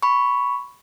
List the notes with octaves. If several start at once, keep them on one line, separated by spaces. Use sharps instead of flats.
B5 C#6